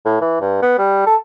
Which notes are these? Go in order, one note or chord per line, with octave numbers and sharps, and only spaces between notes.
A2
E3
G2
B3
G3
A4